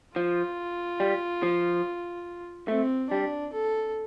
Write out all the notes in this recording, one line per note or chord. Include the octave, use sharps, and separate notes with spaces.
F3 F4
G3
F3
A3 C4
G3 D4
A4